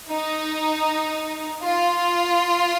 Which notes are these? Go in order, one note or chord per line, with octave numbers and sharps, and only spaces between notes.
D#4
F4